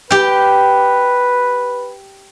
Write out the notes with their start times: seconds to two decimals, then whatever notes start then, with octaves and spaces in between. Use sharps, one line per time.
0.10 G4 B4 G5